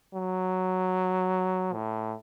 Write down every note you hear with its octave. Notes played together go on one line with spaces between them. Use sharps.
F#3
A2